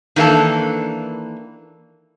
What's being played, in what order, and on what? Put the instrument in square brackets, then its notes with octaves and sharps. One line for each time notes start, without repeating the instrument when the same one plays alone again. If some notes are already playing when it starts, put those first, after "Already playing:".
[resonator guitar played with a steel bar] D#3 E3 A#3 D4 A4